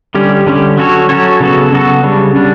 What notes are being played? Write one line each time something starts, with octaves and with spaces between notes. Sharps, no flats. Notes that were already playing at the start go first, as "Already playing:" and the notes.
D3 G3 C#4 G4
D3 G3 C#4 G4
F#3 C#4 F#4 A4 C#5
F#3 C#4 F#4 A4 C#5
C#3 F#3 B3 F#4 A4
C#3 F#3 B3 F#4 A4
C#3 G3 D4
C#3 G3 D4